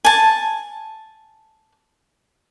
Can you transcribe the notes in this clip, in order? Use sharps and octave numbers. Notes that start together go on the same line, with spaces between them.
G#5 A5